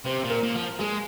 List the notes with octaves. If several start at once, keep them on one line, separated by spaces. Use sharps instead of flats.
C3 C5
A#2
A#4
A#2
F3
G#3 G#4